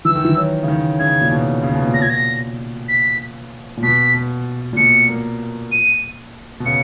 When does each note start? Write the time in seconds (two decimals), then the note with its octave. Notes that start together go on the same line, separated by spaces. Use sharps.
0.05 E3 E6
0.15 D#3
0.25 E3
0.37 F#3
0.63 C#3
0.68 D#3
0.99 C#3 G#6
1.21 A#2
1.31 B2
1.63 C#3
1.75 B2
1.87 A#2
1.94 A#6
1.99 B2 G#6
2.10 A#6
2.88 B6
3.77 A#2
3.83 B2 B6
4.14 B2
4.73 A#2
4.77 B2 C#7
5.09 A#3
5.72 D#7
6.60 B2
6.66 C#3 C#7